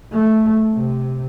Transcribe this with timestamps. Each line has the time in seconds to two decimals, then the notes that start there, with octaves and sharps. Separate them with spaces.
0.12 A3
0.72 C3